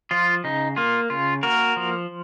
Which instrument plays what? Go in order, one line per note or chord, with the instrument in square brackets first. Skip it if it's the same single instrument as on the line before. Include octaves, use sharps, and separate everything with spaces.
[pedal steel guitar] F3 F4
C#3 D#4
A#3 F4
C#3 F4
A#3 F#4 A#4
F3